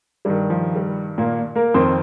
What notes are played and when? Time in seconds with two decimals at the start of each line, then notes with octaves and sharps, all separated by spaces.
0.25 G2 D#3 G3
0.50 F3
0.75 G3
1.18 A#2 A#3
1.55 A#3 A#4
1.74 F2 D#3 C4 C5